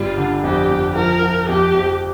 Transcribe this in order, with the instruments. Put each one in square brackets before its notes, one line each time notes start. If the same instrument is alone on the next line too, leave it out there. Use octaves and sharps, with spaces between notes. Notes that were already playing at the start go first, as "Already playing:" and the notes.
Already playing: [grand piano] G1 G3 [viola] F4
[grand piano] D3
[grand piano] F2 [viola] G4
[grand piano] F2
[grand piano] F3 [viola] A#4
[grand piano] F3
[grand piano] F2 [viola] G4
[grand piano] F2